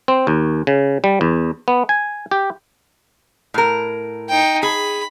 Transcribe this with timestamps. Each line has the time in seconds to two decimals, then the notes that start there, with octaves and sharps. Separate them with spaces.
0.08 C4
0.27 D#2
0.67 C#3
1.04 G3
1.21 E2
1.68 B3
1.89 G#5
2.31 G4
3.54 A2 A#4
4.29 D#4 G5
4.63 G#4 B5